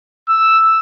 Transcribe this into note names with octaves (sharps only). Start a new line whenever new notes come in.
E6